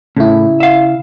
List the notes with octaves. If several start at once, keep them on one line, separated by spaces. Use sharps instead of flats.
A2 C#3 E4
E5 F5